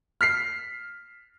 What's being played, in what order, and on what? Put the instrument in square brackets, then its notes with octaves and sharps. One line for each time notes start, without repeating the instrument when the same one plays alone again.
[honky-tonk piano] F6 B6 C7